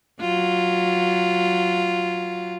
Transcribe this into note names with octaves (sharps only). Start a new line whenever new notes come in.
F#3 F4